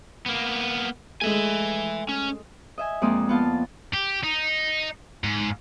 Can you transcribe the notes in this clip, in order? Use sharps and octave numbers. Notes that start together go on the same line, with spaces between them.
A#3 B3
G#3 A3 E5 G#5
C#4
D#5 E5 G#5
F2 G#3 A#3 C4 D5 D#6
B3 F4 A5
G4
D#4
G#2